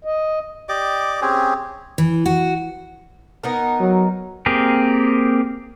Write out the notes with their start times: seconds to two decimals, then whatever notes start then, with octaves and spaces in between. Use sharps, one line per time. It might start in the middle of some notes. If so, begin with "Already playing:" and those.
0.05 D#5
0.69 G4 D5 D#5 D6
1.21 C4 C#4 G4 G#4
1.98 E3
2.26 F#4
3.44 B3 D#4 A#4
3.80 F#3
4.46 A#3 C4 G4 G#4 A#4